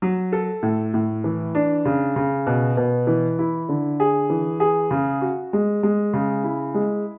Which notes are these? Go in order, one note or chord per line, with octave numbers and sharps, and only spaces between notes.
F#3
A4
A2
A2
E3
D4
C#3
C#3
B2
B2
E3
E4
D3
G#4
E3
G#4
C#3
F#4
G#3
G#3
C#3
E4
G#3